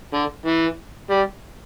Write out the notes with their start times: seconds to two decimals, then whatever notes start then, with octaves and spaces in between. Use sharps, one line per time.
0.14 D3
0.46 E3
1.11 G3